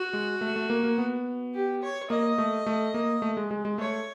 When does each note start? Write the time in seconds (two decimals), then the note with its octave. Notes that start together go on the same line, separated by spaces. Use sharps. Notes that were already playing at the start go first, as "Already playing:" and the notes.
Already playing: F#4
0.13 G#3
0.41 A3
0.56 A3
0.70 A#3
0.83 A#3
0.98 B3
1.54 G4
1.82 C#5
2.10 A#3 D#5
2.38 A3
2.66 A3
2.94 A#3
3.22 A3
3.37 G#3
3.51 G#3
3.65 G#3
3.78 A3 C#5